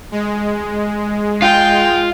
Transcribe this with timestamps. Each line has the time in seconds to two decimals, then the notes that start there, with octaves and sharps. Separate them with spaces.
0.12 G#3
1.42 F4 G5